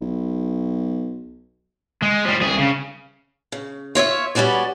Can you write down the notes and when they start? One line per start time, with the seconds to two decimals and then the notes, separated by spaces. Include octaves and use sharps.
0.01 B1
2.02 G#3
2.25 F3 G3
2.41 C2 G#4
2.58 C#3
3.52 C#3
3.95 F4 C#5 D5 E5
4.35 G3 B3 C#4 F#4 D5